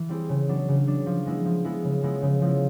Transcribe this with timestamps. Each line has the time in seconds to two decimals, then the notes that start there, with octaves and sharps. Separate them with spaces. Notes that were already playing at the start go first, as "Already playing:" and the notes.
Already playing: E3
0.09 G3 C4 E4 G#4
0.29 C#3
0.48 F#3 B3 D4
0.69 C#3
0.87 F#3 B3 D4
1.06 F3
1.26 G#3 B3 E4
1.45 F3
1.65 G#3 B3 E4
1.84 C#3
2.03 F3 G#3 B3 E4
2.22 C#3
2.42 F3 G#3 B3 E4